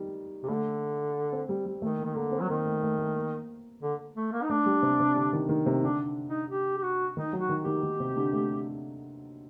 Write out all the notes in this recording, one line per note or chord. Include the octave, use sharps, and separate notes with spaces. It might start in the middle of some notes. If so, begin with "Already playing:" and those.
Already playing: D#3 G3
C3
D3 A3
C4
G3
G3
D#3 A3
A#3
D#3
D3 A#3
C4
F#3
D#3 A#3
A3
A3
A3
A#3
D3
A3
A#3
D#4
A3 D4
G3
C3
C3
D3
D#3
D#3
C3
D3 D4
D#4
G4
G4
F#4
D#3 D#4
F#3
F#4
D#3
G4
D#3
D#3
C3
D3
A3